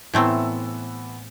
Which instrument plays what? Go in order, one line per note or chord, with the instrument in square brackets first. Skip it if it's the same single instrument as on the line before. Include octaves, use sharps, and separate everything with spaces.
[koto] A2 A3 C4 [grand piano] E3 B3 E6